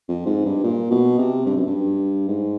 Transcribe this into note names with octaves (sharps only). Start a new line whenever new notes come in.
F2
G#2
G2
A#2
B2
C3
G2
F#2
G2
G#2